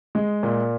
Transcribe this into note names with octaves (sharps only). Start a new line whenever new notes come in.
G#3
A#2